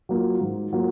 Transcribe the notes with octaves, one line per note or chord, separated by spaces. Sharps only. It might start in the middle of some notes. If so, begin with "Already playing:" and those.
F#3 A#3 F4
G#2
F#3 A#3 F4